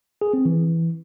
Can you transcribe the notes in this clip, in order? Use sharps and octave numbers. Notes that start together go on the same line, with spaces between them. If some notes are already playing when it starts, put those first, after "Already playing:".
G#4
C4
E3